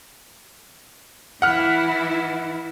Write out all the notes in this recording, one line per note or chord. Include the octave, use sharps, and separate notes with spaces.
E3 E4 F#5 F6